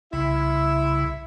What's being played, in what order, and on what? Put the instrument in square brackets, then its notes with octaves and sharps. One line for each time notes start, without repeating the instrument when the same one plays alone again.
[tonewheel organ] C2 C#3 [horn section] E4 E5